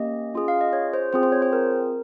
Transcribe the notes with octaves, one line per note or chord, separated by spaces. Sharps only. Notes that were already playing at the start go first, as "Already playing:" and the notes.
Already playing: A#3 C#4 G4 D#5
C#4 F4 G#4
F5
D#5
C#5
C5
C4 F4 G#4 C5
C5
C#5
C5
A#4